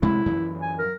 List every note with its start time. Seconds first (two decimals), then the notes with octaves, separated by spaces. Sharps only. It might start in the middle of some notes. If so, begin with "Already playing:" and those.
0.02 C3 G#3 A3 E4
0.26 F#2 E3
0.62 G#5
0.78 A#4